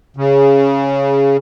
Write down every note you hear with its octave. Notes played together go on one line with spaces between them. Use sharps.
C#3